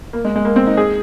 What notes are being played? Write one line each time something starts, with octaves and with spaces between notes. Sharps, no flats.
A#3
G#3
G#3
A#3
C4
D#4
G#4